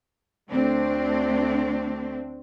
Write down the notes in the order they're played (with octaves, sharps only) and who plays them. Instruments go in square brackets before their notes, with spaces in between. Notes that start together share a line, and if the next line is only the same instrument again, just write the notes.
[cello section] D2 A3 C4 D4